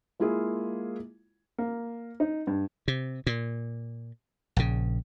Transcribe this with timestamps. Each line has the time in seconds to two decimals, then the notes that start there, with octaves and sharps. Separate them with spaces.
0.20 G#3 A#3 E4 F4 G#4
1.58 A#3
2.20 D#4
2.47 G2
2.88 C3
3.27 A#2
4.56 A#1 C#3